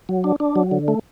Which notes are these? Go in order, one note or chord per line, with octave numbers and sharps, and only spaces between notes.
F#3
D4
D4
F#3
D3
A3